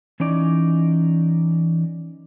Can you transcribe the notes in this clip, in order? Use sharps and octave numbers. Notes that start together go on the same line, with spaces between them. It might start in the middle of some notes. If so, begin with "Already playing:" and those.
E3 C#4 D#4 D5